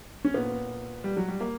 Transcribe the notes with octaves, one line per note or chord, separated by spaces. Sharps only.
C#4
A#2 B3
G3
F#3
G3
A#3